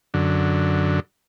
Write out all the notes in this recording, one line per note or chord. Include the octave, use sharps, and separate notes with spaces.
F#2 D3